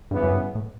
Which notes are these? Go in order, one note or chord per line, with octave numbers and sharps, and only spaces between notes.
G2 C#3 E3 B3
F#2
G2
A2